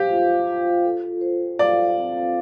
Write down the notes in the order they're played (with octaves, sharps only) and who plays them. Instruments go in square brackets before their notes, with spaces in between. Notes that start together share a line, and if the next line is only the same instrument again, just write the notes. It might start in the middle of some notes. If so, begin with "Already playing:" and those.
Already playing: [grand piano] G4 [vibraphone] C5 F5
[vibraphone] F4
F4
A4
C5
[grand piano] D5 [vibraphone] F5
[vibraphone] C4